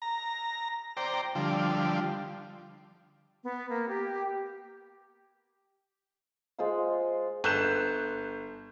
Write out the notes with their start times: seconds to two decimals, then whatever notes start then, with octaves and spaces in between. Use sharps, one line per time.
0.02 A#5
0.97 C5 D5 G5 A#5
1.35 D3 F3 G3
3.44 B3
3.70 A#3
3.88 G4
6.59 G#3 F4 C5 F5
7.44 G1 F#6 G6 E7